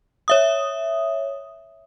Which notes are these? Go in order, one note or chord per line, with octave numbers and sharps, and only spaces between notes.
C#5 E5 D#6